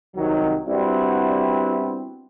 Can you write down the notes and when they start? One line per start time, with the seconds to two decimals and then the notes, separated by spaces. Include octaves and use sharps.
0.16 C2 D#3 F#3
0.69 G3 B3 C4 D4 E4 F#4